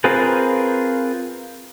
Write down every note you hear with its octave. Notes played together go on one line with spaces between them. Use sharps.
C4 F4 G#4 A#4 B4